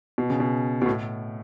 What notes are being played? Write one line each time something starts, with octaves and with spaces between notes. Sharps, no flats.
B2
C#3
B2
B2
A2